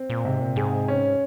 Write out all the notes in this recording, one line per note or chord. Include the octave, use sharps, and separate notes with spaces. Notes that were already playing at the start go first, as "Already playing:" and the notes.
Already playing: C4
A#2
G#2 C3
A#2
G#2 G#4
C#4